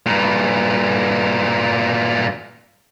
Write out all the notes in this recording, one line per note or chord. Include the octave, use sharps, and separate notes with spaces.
G2 A#2